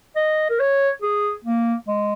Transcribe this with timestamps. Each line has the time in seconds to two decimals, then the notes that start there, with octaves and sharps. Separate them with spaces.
0.16 D#5
0.50 A#4
0.60 C#5
1.02 G#4
1.44 A#3
1.88 G#3